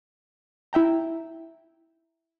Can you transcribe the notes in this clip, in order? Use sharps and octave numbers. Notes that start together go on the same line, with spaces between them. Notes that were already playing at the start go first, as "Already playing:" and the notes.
E4 E5 G5 A#5